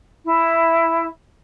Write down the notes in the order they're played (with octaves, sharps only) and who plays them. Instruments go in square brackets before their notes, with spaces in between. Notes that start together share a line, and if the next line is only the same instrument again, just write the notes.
[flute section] E4